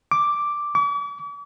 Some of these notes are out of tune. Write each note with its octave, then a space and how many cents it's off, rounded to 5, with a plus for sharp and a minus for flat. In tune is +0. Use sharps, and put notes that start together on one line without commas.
D6 +0
D6 -45